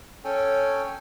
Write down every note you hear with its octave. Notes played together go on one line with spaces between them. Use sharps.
C#4 A4 C#5 G5 G#5